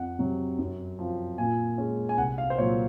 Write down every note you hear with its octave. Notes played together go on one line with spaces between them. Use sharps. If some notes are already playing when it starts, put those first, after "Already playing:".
Already playing: F2 F#5
C3 F#3
F#2
F3 C4
A#2 G#5
G#3 C#4
G#5
C2 F#5
F5
C5
A#2 F#3 C#5